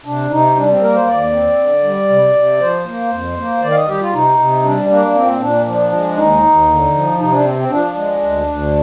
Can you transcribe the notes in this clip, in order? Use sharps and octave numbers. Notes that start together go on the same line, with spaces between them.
C3 D4
C3 D#4
G3 D4
C4
A#3 A#4
C5
D#2 D5
C4
D3
G3
C3
C3
F3 C5
A#3
F2
A#3
D#3 D5
F5
D#5
G3 G4
F4
C3 D#4
C3
G3 D4
A#3 D4
A#2 C4
A#2 D4
F3 D4
G#3
D#2 D#4
D#2
D3
F3
C3 D#4
D4
C4
C4
F3 D4
G#3
D2
D2